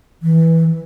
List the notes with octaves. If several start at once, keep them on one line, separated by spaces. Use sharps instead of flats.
E3